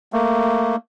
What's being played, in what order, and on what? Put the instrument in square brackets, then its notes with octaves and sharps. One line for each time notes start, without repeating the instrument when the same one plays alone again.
[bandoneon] A3 A#3